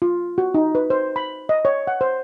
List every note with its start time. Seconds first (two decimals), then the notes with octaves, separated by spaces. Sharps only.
0.02 F4
0.38 F#4
0.54 D#4
0.75 B4
0.90 C5
1.16 B5
1.49 D#5
1.65 C#5
1.87 F#5
2.01 C5